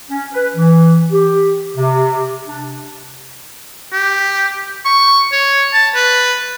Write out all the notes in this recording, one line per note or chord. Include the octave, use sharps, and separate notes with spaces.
C#4
B4
E3
G4
C3
D4
G4
C#6
C#5
A5
B4